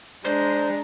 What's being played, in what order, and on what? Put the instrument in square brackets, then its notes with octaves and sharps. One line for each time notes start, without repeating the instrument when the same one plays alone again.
[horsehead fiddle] G#3 A#5 [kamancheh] D4 [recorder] C5 [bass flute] D5